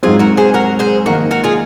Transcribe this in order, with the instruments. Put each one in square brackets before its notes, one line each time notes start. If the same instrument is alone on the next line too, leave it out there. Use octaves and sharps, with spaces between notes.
[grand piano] G#2 F#3 C4 [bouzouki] F4 G#4
[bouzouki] F#4 A#4
G#4 C5
F#4 A#4
G#4 C5
[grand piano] D#3 A#3 D#4 [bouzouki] F#4 A#4
[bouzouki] F#4 A#4
F4 G#4